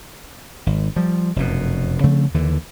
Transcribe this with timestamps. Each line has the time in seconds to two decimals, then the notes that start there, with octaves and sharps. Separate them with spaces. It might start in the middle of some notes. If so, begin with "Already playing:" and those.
0.66 G#1
0.96 F3 G3
1.36 F1 F#2 B2
2.04 C#3 F3 A3 C4
2.34 D#2 D3 E3